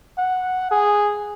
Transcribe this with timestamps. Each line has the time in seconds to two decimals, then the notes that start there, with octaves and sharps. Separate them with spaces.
0.18 F#5
0.71 G#4